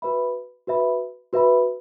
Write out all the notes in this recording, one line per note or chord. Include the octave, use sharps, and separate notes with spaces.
F#4 B4 E5 B5
F#4 B4 E5 B5
F#4 B4 E5 B5